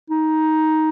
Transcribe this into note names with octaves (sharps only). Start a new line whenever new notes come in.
D#4